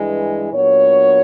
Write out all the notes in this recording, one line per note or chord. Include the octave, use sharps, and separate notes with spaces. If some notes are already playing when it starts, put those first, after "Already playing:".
Already playing: G2 E3 G#3
A#2 F#3 B3 D4 C#5